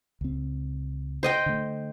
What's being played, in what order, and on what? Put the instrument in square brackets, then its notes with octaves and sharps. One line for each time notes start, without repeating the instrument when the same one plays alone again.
[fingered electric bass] C#2 C4
[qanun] C5 D#5 G5
[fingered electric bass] D3 A3